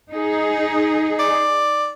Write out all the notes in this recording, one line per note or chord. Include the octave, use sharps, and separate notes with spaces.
D#4 G#4
D5